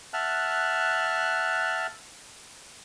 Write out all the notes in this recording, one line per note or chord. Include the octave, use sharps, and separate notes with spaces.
E5 F#5 A5 F6 F#6